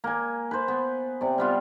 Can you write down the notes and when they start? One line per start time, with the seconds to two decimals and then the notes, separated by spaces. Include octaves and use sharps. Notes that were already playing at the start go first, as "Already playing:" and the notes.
0.04 A#3 G#5
0.51 B4 C5
0.68 B3
1.21 C3 D5
1.38 G3 B3 F4